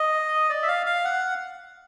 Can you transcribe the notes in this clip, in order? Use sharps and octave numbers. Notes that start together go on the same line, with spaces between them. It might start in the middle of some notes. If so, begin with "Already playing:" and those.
Already playing: D#5
D5
E5
F5
F5
F#5